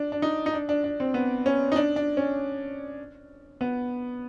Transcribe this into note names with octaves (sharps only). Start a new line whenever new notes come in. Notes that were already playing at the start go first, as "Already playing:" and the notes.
Already playing: D4
D4
D#4
D#4
D4
D4
D4
C4
B3
C#4
D#4
D4
D4
C#4
B3